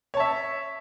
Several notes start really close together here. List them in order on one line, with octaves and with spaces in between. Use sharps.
C#5 A5 E5